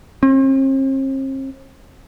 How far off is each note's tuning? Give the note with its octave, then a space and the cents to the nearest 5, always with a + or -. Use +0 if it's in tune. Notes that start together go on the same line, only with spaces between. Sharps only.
C4 +45